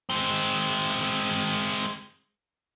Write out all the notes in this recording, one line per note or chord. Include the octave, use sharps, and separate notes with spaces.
G#3 C4